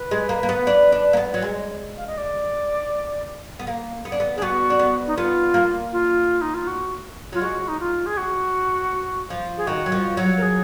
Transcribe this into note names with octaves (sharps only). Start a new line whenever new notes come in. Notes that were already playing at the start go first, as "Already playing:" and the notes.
Already playing: B4
G#3
A#3
A#3
B3
D4
D4
A#3
B3
F#3
G#3
F5
D#5
D5
B3
A#3
B3
D4
B3
D4 G#4
B3 F#4
D4
B3
D#4
B3 F4
A#3
F4
D#4
F4
F#4
F#3 F4
G#3 F#4
D#4
F4
G#4
F#4
F3
G#4
D#3 F#4
F#3
F3
F#3
A#4
G#4